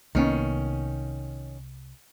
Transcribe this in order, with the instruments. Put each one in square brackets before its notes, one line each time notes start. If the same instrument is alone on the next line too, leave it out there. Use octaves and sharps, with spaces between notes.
[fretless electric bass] C2 A#3 B3 [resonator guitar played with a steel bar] D#3 C#4